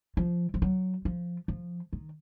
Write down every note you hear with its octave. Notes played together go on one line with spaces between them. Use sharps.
F3
F3
F#3
F3
F3
D#3